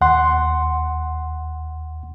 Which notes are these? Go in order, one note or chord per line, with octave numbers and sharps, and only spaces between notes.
D#2 F#5 C6